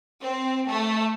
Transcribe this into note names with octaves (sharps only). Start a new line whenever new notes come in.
C4
A3